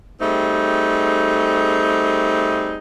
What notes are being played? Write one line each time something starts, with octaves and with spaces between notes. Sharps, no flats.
G3 A3 C4 D#4 G#4